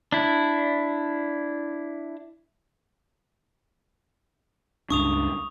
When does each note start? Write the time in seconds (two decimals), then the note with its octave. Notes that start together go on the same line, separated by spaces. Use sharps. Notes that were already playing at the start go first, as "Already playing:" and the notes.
0.12 D4 E4
4.90 C#2 G2 D4 C#6 D#6 F7